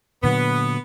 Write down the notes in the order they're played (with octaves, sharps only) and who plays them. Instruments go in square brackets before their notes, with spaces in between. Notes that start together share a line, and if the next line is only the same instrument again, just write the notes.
[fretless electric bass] A#2 D3 F#3 [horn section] B3